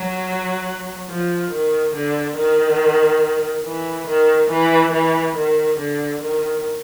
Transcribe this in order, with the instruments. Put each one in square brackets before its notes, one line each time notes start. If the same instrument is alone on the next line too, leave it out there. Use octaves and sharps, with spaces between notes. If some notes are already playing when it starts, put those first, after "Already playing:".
Already playing: [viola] F#3
F3
D#3
D3
D#3
E3
D#3
E3
E3
D#3
D3
D#3